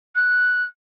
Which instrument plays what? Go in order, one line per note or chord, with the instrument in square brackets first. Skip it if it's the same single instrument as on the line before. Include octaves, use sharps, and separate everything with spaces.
[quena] F#6